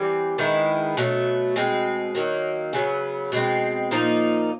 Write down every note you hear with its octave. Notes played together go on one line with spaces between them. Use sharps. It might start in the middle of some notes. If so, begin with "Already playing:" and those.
Already playing: E3 G3 C4
D#3 G#3 B3 E4
B2 F#3 A3
B2 G#3 C4
D#3 F#3 A#3
C#3 F#3 B3
B2 G#3 C4
A#2 F3 A#3 D#4